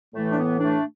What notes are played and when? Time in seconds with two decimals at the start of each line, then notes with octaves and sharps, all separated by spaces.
0.14 A2 E3 A3
0.30 D4
0.37 B3
0.59 A3 D4